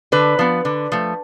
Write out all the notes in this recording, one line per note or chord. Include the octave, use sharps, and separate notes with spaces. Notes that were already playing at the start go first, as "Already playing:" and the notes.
D3 B4
F3 B3
D3
F3 A3